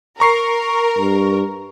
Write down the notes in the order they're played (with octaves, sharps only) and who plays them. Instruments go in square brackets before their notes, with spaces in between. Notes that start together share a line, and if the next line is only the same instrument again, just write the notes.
[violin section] A#4 [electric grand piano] A#5 C#6 C7
[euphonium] G2